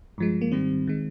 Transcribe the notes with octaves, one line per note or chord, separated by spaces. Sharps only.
G2 F3 G#3
A#3
G#2 D#3 G3 C4
D#3 G#3